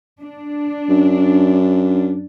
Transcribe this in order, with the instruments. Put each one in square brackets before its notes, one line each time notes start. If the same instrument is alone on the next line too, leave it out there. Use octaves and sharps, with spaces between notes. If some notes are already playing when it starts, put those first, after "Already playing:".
[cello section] D4
[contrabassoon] F#2